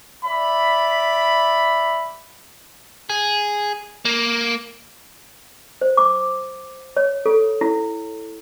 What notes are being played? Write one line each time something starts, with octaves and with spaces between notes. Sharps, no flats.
D5 E5 B5
G#4
A#3
C5
D6
C#5
A4
E4